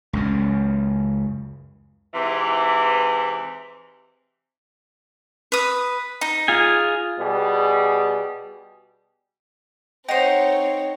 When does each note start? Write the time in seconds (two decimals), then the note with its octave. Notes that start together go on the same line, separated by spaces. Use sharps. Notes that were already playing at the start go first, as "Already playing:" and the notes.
0.13 C#2 F#2 C#3
2.13 G#2 C3 E3
5.52 B4 D#6
6.21 D#4
6.48 F4 G#4 G#5
7.19 B2 G3 G#4
10.08 C4 D#4 C5 C#5 F#5 G5